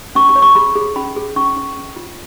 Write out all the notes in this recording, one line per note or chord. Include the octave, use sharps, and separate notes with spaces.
C#4 C#6
C#6
C#5
C#6
G#4 B5
G#4
C#4 B5
G#4
C#4 C#6
C#4
C#4
F4